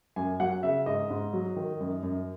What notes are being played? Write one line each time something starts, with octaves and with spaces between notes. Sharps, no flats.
F#2 G#5
F#3 F#5
C#3 E5
G#2 D#5
G#2
F#3
D#3
F#2
F#2